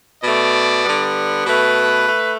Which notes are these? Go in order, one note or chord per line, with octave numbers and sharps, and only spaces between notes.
B2 A3 D5
D3 G3 B3
B2 A3 B4
A3